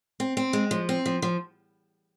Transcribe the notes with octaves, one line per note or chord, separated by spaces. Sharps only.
C4
C4
G#3
F3
C4
F3
F3